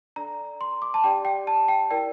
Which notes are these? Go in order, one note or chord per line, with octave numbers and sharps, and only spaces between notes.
D4 A4 D5 A#5
C6
D6
A5
D4 G4 D5 G5
G5
A5
G5
E4 A#4 D5 G5